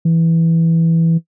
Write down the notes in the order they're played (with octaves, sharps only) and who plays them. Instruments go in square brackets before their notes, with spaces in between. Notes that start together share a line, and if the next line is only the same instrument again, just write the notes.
[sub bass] E3